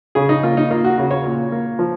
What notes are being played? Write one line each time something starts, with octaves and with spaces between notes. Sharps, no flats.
C#3 G#4
D#4
A#3 F4
D#4
A#3 F4
F#4
C#3
C#5
A#2
A#3
F3